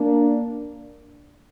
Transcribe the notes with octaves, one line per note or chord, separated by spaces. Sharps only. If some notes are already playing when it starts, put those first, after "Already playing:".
Already playing: A#3 D4